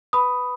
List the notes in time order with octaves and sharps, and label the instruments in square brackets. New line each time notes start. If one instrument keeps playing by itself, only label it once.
[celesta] B4 B5 D#6